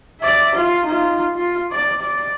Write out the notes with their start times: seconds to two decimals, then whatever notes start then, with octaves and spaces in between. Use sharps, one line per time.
0.20 D5 E5
0.55 F4
0.85 D#4 F4
1.35 F4
1.71 D5
2.01 D5